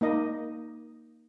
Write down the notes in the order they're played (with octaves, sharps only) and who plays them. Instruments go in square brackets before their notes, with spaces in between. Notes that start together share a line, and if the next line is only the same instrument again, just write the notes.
[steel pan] A#3 D#4 D#5